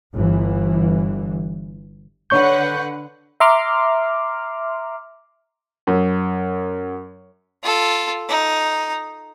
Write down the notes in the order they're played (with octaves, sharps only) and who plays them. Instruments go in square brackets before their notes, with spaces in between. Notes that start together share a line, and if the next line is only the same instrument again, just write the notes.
[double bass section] G1 E3
[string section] D3 B4 F#5 [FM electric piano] C#5 C#6 G6
[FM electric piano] E5 A#5 C6 D6 F6
[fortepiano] F#2
[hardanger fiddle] F4 A4
D#4